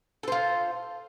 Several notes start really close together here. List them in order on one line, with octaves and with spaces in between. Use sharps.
A4 C5 F4